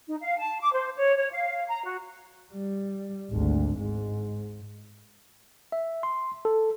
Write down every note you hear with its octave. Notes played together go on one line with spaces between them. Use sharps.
D#4
F5
A5
D6
C5
C#5
C#5
F5
A#5
F#4
G3
G#1 D2
G#2
E5
C6
A4